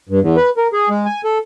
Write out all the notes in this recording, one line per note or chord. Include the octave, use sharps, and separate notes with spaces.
G2
E2
B4
A#4
G#4
G#3
G#5
A4